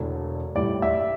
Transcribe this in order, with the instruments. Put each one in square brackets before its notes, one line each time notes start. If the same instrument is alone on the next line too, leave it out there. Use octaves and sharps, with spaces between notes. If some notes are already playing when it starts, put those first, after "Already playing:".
Already playing: [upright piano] E1 E2 D3 A3 D4
[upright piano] A1 A2 G3 [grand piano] D5
[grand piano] E5